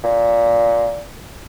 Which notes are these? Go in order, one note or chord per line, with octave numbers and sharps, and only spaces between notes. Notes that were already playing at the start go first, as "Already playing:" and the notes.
A#2